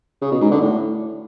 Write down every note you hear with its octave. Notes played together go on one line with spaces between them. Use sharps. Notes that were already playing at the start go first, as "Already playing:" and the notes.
C#3
B2
G#2
D3
A2